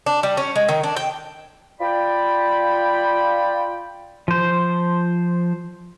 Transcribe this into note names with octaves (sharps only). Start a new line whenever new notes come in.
D4
G3
C#4
G#3
D#3
D4
G5
F4 D5 G5 B5
F3 C5